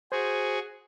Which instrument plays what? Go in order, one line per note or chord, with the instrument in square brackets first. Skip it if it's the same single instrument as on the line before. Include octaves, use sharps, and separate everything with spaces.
[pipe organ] F#4 G#4 [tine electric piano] C5